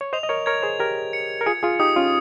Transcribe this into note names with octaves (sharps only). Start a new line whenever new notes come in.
C#5
C5 D#5 F7
D#5
A#4 C#5
A#4 C#5 G#6
G#4 C5
G4 A#4 G#6
C#7
A#4
F4 G#4 C#7
F4 G#4
D#4 G4 D#6
C#4 F4